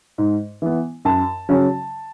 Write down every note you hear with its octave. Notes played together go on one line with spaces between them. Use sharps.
G#2
E3 B3
F#2 A5
C#3 F#3 C#4